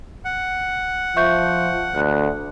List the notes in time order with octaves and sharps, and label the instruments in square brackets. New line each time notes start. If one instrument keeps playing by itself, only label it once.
[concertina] F#5
[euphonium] F3 [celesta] E5 C#6 G6
[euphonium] D2 [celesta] F#6